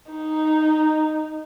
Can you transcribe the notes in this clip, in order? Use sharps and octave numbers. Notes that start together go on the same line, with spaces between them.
D#4